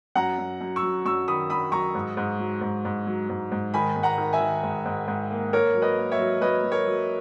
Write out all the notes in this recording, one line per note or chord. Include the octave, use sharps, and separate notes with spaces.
F#2 F#5 A#5
F#2
F#2
C#6 E6
F#3
F#2 C#6 E6
D#3 B5 D#6
F#3 B5 D#6
F#3 A#5 C#6
G#2
G#2
F#3
G#2
G#2
F#3
G#2
G#2
D#3 G#5 B5
G#2
F#5 A#5
D#3
E5 G#5
D#3
G#2
G#2
G#2
A#3
A#3 A#4 C#5
F#3
B4 D#5
A#3
C#5 E5
F#3
F#3 B4 D#5
F#3
A#4 C#5
F#3